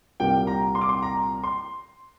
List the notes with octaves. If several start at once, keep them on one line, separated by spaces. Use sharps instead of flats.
C2 A#2 G3 A#3 G5
A#5
C6
D6
C6
A#5
C6